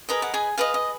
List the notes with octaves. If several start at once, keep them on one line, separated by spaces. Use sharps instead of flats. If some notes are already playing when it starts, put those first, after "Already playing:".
G#4 A#4 B4 D#5 A#5
F#5
G#4 G#5
G#4 B4 D#5 F5
D#5